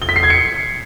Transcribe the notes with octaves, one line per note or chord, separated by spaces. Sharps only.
G7
B6
C7
G#6
C#7